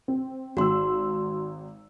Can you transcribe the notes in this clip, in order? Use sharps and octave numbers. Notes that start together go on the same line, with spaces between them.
C4
G#1 F#4 C6 E6